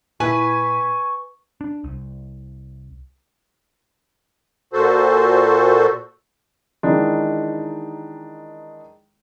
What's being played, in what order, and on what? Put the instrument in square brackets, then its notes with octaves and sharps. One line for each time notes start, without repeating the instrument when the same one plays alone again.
[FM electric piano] A#2 E4 B6 [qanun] B4 [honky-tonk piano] G#5 [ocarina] C#6
[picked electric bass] D4
C2
[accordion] A#2 F#4 A4 C5
[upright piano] D#3 E3 G#3 D4 D#4